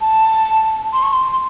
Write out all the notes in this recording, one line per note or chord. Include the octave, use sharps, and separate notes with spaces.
A5
C6
C#6
C6